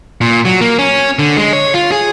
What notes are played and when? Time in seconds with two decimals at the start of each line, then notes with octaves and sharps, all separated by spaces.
0.21 A#2
0.45 F#3
0.61 A#3
0.79 C#4
1.19 D3
1.37 G#3
1.53 C#5
1.74 F4
1.92 G#4